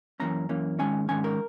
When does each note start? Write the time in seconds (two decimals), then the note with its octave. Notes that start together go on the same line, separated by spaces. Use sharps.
0.20 F#2 E3 A#3 C#4 A#5
0.49 F#2 E3 A#3 C#4
0.79 G#2 D#3 G#3 C#4 G#5
1.09 G#2 D#3 G#3 C#4 G#5
1.24 A#4